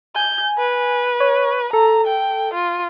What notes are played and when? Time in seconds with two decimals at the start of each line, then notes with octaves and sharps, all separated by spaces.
0.16 G#5 G6
0.58 B4
1.20 C#5
1.73 A4 A#5
2.07 G5
2.54 F4